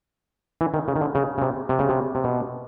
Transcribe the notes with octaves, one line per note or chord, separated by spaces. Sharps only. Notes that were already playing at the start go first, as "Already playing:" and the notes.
E3
D#3
C#3
D#3
D3
C#3
C#3
C3
C3
C#3
C3
C3
B2